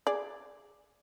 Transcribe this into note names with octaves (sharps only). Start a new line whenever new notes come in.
G#4 D5